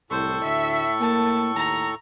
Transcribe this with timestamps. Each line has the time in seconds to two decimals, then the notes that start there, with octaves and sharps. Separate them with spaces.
0.11 C2 A2 A4 C5 C#6
0.43 D2 E5
1.01 A#3 A5
1.56 D#2 A#5